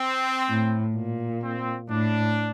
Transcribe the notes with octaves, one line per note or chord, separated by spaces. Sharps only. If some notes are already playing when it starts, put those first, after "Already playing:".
Already playing: C4
A2
A#2
C4
A2 D4